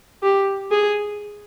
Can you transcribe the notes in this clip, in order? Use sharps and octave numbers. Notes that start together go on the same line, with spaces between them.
G4
G#4